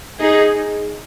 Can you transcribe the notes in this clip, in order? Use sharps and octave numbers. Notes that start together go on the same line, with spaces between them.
D#4 G#4